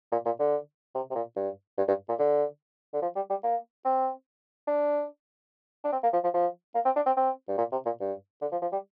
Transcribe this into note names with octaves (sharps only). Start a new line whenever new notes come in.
A#2
A#2
D3
C3
C3
A#2
G2
G2
G2
A#2
D3
D3
F3
G3
G3
A#3
C4
D4
D4
C4
A#3
F3
F3
F3
A#3
C4
D4
C4
C4
G2
A#2
C3
A#2
G2
D3
F3
F3
G3